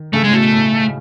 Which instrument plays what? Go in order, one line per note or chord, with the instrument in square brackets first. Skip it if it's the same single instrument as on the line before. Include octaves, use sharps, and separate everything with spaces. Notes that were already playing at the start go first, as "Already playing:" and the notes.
Already playing: [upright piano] D#3
[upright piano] C#3 [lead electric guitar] A3
[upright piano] A2 [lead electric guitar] G#3
[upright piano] B2 [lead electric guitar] A3
[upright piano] A2